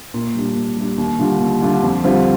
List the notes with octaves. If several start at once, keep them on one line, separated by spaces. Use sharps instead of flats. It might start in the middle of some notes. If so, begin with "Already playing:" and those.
A#2
G3 D4
A#2
G3 D4
D#2
D3 G3 D4 F4
D#2
D3 G3 D4 F4
F2
D3 G3 C4 F4